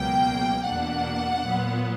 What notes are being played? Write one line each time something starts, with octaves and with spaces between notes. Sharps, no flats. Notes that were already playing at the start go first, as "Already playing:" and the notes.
Already playing: C#2 B2 F#3 A#3 G5
E2 B2 A#3 D4 F#5
A#2 F#3 B3